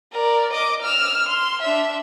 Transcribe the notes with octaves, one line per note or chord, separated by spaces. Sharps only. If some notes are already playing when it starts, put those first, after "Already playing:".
A#4 D5
D#5 D6
E6 F6
C6
D4 E5